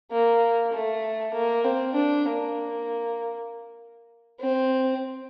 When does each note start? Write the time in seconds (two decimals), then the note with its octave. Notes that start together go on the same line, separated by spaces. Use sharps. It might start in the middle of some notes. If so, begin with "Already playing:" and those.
0.11 A#3
0.73 A3
1.34 A#3
1.64 C4
1.94 D4
2.25 A#3
4.40 C4